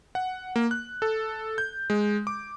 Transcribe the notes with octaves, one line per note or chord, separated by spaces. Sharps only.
F#5
A#3
F#6
A4
G6
G#3
D6